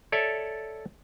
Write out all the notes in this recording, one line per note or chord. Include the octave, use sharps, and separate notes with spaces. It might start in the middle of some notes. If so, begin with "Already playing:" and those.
A4 C#5 D5 E5